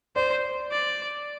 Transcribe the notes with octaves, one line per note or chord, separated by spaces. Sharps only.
C5 D5
D5